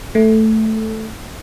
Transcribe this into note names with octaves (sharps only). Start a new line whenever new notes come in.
A3